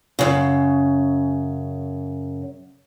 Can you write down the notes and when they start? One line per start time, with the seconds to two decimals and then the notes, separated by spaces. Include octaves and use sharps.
0.19 F#2 C#3